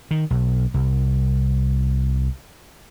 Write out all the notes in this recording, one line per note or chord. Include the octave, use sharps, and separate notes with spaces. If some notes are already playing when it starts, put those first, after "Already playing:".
D#3
B1
C2